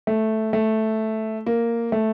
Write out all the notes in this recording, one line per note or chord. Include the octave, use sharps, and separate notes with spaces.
A3
A3
A#3
A3